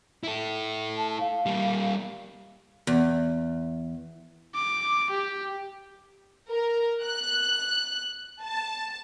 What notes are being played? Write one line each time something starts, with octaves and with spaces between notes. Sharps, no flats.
E4 A4
A5
F5
G3 A#3
E2
D6
G4
A#4
F#6
A5